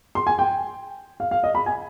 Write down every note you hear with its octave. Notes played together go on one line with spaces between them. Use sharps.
C6
G#5
G5
F5
F5
D#5
B5
G#5